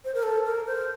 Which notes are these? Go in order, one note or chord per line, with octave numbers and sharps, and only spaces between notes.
C5
A#4
A4
A#4
C5